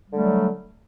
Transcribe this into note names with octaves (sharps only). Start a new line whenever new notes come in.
D3 F#3 G3 A3